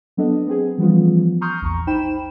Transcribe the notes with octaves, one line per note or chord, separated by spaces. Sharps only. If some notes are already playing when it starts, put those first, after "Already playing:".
F#3 B3 D4 A4 D#5
B3 C4 G#4
E3 F3 G3 B3 C#4 F4
A#5 C6 C#6 D#6 F6 G6
A#1 E2 A#5 C#6
D#4 C5 G5 B5 E7